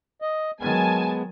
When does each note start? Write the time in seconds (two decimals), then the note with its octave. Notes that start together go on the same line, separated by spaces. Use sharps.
0.22 D#5
0.61 D#3 F#3 G#3 B3 G#5 A5